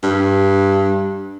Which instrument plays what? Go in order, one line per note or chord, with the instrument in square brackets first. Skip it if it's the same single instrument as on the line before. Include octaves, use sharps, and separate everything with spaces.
[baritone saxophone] G2